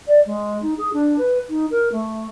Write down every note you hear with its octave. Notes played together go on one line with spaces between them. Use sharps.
D5
G#3
D#4
G#4
D4
B4
D#4
A#4
A3